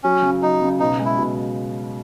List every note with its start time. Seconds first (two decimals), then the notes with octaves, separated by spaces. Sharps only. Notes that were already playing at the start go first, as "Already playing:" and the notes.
0.04 F#3 C#4
0.22 C#3
0.42 F#3 D#4
0.62 C#3
0.80 B2 D#4
0.99 G#3
1.05 E4
1.18 B2